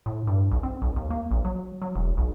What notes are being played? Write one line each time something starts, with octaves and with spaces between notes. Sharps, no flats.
A2
G2
B1
C4
B1
D#2
A#3
A#1
F#3
F#3
E1
B1